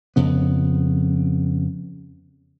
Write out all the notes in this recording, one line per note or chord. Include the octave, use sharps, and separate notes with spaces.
F2 C#3 B3